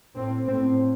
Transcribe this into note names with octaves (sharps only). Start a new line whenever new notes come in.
A2 C4
A2 C4